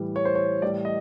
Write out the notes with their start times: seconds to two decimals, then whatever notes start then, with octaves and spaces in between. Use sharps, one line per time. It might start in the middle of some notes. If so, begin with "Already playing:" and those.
Already playing: A2 E3 G3
0.16 C#5
0.25 C5
0.35 C#5
0.62 A2 E3 G3 D5
0.85 D#5